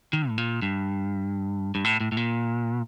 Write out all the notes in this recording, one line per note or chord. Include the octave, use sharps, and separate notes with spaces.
D#3
A2
A#2
G2
G2
A2
A2
A2
A#2